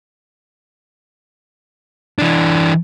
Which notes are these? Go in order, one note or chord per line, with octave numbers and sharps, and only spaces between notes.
E3 D4